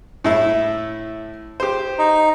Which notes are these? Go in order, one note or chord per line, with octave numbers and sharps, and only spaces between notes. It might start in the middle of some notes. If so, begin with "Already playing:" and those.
A2 E4 E5
G4 C5
D#4